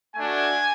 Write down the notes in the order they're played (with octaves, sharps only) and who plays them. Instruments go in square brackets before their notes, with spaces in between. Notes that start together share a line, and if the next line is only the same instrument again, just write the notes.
[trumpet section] A3 D4 F#4 G#5